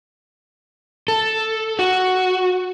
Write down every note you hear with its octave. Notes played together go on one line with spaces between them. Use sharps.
A4
F#4